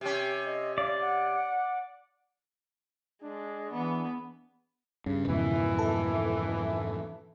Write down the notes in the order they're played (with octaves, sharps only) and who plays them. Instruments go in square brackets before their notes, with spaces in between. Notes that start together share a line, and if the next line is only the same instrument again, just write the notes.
[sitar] C3 C#4 [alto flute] G4
[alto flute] D#5
[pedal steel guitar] D5 [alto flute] F5
[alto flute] F#5
[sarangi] G#3 [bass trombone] D4
[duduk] E3 [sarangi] B3
[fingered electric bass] G2 [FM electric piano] C#3
[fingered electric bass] F2 G#2 B2 [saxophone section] D#3 E3
[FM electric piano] A4 E5